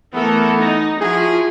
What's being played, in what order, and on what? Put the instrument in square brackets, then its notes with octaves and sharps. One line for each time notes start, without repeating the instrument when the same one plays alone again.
[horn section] E3 B3 [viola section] A3 A4 A#4
[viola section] D#4
[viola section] F3 [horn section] E4 F#4 G#4